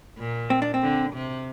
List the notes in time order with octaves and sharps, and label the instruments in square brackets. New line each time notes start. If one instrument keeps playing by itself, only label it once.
[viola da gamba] A#2
[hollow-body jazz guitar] C4
D4
C4
[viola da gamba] D3
C3